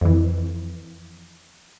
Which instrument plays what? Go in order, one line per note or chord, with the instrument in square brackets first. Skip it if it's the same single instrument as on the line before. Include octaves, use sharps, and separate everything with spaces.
[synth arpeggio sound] F2 E3